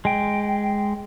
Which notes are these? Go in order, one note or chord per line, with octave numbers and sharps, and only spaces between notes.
G#3 G5